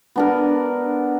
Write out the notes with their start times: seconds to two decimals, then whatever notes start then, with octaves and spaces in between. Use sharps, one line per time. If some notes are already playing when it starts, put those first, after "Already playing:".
0.16 B3 D4 A#4